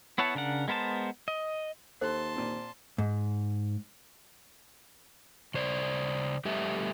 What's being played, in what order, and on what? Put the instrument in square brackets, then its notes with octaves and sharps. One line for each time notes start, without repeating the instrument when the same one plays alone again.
[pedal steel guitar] B3 E4 C#5 F#5 A5
C#3 D4 A#4 F#5
G#3 B3 A#4 C5 A5
D#5
[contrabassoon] D#2 [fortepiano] A4 [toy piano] C5 [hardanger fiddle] A5 C6
[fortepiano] A#2 C4
[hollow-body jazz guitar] G#2
[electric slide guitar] C#3 C5 D5
G3 A3 G4 B4 E5